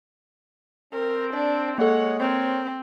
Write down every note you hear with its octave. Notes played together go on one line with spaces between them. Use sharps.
C4 A#4
D4 D5
G#3 A#3 A4 C#5 F#5
C4 A#4 C5 C#5